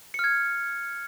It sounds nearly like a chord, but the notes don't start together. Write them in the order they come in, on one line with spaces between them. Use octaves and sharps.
C#7 F6 G#6